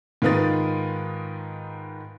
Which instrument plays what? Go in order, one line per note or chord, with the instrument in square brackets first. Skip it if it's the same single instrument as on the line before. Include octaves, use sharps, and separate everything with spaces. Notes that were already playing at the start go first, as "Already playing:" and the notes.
[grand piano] G#2 D#3 F4 B4 D#6 A6